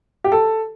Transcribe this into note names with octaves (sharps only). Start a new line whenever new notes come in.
G4
A4